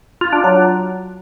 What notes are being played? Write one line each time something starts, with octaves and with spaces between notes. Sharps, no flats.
F4
D4
F#3